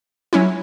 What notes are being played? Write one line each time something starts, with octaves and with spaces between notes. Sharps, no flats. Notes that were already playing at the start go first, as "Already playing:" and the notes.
F#3 C#4 E4